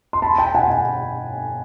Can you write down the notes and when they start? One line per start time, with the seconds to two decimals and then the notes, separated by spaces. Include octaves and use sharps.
0.13 C6
0.22 A5 B5
0.38 G5 A5
0.55 F#5 G#5
0.70 F#5 G#5